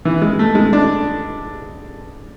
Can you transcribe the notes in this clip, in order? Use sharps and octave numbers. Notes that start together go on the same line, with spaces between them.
E3
G#3
A3
G#3
D4